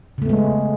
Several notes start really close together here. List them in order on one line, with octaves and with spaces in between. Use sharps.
C#3 A3 B3 G#3